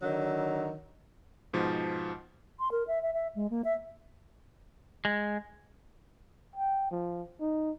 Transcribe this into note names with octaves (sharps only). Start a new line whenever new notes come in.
D3 D#3 F#3
G#2 B2 F3
C6
A#4
E5
E5
E5
G#3
A#3
E5
G#3
G5
F3
D#4